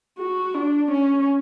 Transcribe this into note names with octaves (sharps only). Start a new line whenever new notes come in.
F#4
D4
C#4